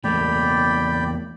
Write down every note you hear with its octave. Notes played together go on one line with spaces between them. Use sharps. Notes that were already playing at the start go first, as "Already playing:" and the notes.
E2 A3 A#3 D5 G5 B5